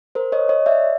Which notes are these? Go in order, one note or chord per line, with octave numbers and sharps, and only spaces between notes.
A#4 C5
C#5 D#5
C#5 D#5
D5 E5